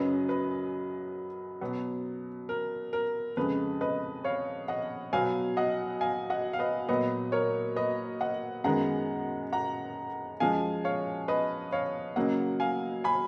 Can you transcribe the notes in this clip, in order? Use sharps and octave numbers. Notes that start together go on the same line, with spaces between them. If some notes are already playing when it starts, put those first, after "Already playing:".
Already playing: F#2 C#3 F#3 B4 D#5
B4
B2 F#3 B3
A#4
A#4
F2 C#3 G#3 B4
B4 D#5
C#5 F5
D#5 F#5
B2 F#3 B3 F5 G#5
D#5 F#5
F5 G#5
D#5 F#5
F5
B4 D#5
A#2 F#3 B3 B4 D#5
A#4 C#5
B4 D#5
D#5 F#5
F#2 D#3 G#3 B3 F#5 A#5
F#5 A#5
F#2 F3 G#3 F5 G#5
C#5 F5
B4 D#5
C#5 F5
C#3 F#3 A#3 D#5 F#5
F5 G#5
G#5 B5